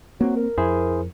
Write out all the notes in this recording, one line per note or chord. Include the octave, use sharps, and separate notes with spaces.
F#3 A#3 C4
A#4
F2 E4 G#4 C5